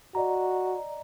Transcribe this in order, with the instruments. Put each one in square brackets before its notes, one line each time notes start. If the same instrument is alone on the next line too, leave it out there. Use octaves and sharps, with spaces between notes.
[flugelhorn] F#4 [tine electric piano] D5 D#5 A#5